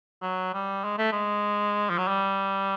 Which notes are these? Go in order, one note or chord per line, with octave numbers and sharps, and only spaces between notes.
F#3
G3
G#3
A3
G#3
F3
F#3
G3